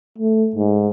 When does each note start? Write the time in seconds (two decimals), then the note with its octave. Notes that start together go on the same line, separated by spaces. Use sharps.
0.18 A3
0.56 G#2